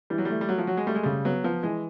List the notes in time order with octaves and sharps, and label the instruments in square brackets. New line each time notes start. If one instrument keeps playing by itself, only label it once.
[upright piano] E3 [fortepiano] G3
[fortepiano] F#3
[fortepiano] G3 [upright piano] A3
[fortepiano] G3
[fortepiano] F#3 [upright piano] F#4
[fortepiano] F3
[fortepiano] F#3 [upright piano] F#4
[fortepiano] G#3
[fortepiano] G3 [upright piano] A3
[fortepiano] G#3
[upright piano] C#3 [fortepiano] G3
[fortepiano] F#3 [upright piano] B3
[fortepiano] F3 [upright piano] B3
[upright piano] E3 [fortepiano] G#3